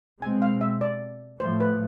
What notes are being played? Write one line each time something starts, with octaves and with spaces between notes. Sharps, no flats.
B2 G#3 C4 G#5
F5
E5
D5
A2 F3 A3 C5
B4